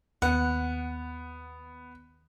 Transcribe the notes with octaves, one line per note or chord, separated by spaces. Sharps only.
D#2 B3 F#5